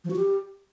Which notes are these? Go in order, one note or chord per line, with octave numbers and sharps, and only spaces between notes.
F3
F#4
G4